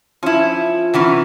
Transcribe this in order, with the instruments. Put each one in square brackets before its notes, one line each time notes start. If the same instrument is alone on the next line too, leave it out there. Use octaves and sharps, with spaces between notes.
[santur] F3 [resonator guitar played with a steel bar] C#4 E4
[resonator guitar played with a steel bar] C3 E3 C#4 [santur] F#5 B5 C#6